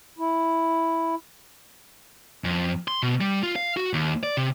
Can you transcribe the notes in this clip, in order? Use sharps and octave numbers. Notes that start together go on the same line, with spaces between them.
E4
F2
C6
B2
G3
F4
F5
F#4
D#2
D5
C3